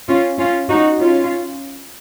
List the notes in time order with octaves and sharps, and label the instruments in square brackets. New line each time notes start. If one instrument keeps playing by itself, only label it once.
[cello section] C#4 F4
C#4 F4
D#4 F#4
C#4 F4